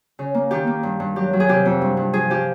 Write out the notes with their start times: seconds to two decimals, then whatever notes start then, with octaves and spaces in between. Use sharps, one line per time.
0.19 C#3
0.34 A#3
0.51 D#3 G4
0.67 A#3
0.83 G2
1.00 G2
1.16 F#3 G4
1.33 F#3
1.40 G#4
1.49 C3 G4
1.65 F2
1.81 G2
1.97 G2
2.14 F3 G#4
2.30 F3 G4